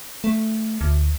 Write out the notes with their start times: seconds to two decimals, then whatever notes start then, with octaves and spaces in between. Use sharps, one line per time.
0.24 A3
0.81 D2